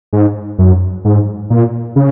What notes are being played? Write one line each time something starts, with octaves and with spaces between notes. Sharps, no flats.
G#2
F#2
G#2
A#2
C#3